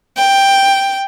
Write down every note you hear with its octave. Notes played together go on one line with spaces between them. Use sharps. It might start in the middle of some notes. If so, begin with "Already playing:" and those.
G5